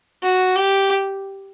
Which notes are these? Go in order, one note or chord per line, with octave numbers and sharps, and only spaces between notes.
F#4
G4